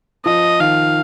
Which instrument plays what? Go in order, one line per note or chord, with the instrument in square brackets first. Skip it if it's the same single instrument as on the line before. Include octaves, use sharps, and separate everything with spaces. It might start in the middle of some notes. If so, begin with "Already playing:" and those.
[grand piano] F3 [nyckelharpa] D#5
[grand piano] D#3 [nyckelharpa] F5